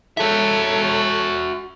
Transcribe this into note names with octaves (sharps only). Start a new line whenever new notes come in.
F#4 A4 C#5 E5